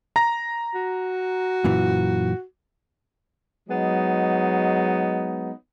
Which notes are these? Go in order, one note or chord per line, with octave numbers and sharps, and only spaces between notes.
A#5 A#6
F#4
F#2 A#2 E3
F#3 G#3 B3 D#4